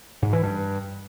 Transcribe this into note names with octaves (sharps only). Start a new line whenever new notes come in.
G#2
E3
G2